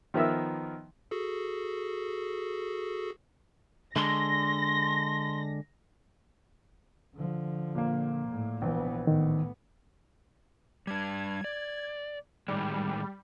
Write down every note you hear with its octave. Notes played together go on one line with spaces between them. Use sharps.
D#3 F3 B3 A#4 E5 E6
F#4 G#4 A4
D3 G#3 D4 C6 A#6
D3 F3
A#2 A#3
A2
A#1 E3 B3
A2 D#3 B3
G3 D4 G#6
D5
A2 D#3 G3 G#3